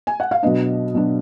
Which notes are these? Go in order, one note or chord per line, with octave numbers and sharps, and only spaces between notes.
G#5
F#5
F5
B2 F#3 B3 D4 D#5
B2 F#3 B3 D4